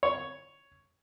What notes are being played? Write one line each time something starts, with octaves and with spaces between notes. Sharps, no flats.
C#5